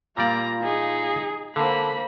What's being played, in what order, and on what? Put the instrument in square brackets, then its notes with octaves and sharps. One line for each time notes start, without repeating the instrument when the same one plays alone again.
[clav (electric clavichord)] A#2 G3 D5 [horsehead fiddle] A#3 [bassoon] F4 [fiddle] A#5
[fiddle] D#4 [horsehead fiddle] G#4
[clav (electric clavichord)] D3 [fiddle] A#3 C5 [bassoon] A4 [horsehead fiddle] B5